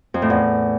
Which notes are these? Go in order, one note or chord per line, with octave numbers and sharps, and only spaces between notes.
F2
A2
E2